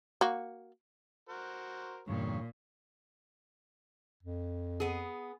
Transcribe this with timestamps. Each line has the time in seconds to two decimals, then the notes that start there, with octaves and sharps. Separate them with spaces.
0.21 A#3 F#4
1.29 F#4 A#4 C5
2.08 E2 G2 A#2 D3 D#3 C#5
4.23 F2
4.80 B3 G#4